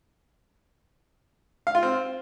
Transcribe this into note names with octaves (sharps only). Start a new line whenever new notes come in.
F5
F4
C4